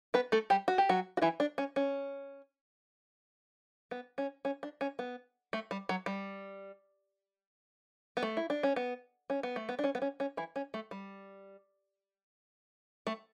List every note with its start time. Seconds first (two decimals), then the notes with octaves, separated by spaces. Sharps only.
0.14 B3 B4
0.32 A3 A4
0.50 G3 G4
0.68 F#4
0.78 G4
0.89 F#3 F#4
1.17 F#4
1.22 E3 E4
1.40 D4
1.58 C#4
1.76 C#4
3.91 B3
4.18 C#4
4.45 C#4
4.63 D4
4.81 C#4
4.99 B3
5.53 A3
5.71 G3
5.89 F#3
6.06 G3
8.17 B3
8.23 A3
8.37 E4
8.50 D4
8.63 C#4
8.76 B3
9.30 C#4
9.43 B3
9.56 A3
9.69 B3
9.79 D4
9.84 C#4
9.95 B3
10.02 C#4
10.20 C#4
10.37 E3 E4
10.56 C#4
10.74 A3
10.91 G3
13.07 A3